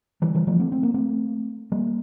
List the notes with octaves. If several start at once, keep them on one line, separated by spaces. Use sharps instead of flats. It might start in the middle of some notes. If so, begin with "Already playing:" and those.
E3 G3
E3 G3
F3 A3
A3 C4
C4
A#3
A3 C4
G3 A#3